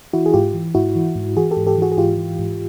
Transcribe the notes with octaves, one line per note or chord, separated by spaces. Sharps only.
E3 E4 F#4
G#4
G#2 F4 G4
E3
G#2 E4 F#4
E3
G#2
E3 F#4 G#4
G4 A4
G#2
G4 A4
E3 F#4 G#4
G#4
G#2 F4 G4
E3
G#2